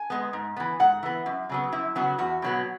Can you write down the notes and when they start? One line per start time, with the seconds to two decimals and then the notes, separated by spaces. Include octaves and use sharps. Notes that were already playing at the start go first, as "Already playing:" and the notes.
Already playing: G#5
0.10 G#3 B3
0.33 G#2
0.56 E3 B3
0.80 G#2 F#5
1.03 E3 B3
1.26 F#2
1.49 C#3 F#3 B3
1.72 F#2 E4
1.96 C#3 F#3 B3 F#4
2.18 E2 F#4
2.42 B2 F#3 B3